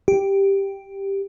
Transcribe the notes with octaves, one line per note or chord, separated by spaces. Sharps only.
G4